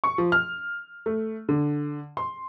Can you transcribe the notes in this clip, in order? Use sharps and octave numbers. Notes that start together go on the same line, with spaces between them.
C#6
F3
F6
A3
D3
C6